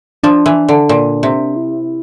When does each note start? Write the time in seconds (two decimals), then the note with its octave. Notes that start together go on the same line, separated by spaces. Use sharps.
0.24 F3 D4
0.46 E3
0.69 D3
0.89 A#2
1.23 C3
1.56 E4